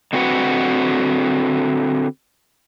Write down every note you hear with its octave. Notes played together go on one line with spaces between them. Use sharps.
D3 C4 F#4 B4 F#5